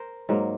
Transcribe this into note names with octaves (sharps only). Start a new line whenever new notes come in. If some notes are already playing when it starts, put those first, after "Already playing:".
Already playing: A#4 C5
G#2 F#3 A#3